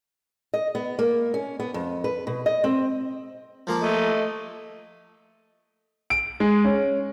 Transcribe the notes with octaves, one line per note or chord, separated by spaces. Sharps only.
D#5
B3
A#3
C#4
B3
F2
B4
B2
D#5
C4
F3 A#3 A5
A3 D#5
D7
G#3
C#4